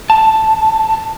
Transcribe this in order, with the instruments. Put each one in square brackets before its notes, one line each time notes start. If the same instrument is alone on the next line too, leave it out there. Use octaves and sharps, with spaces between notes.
[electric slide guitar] A5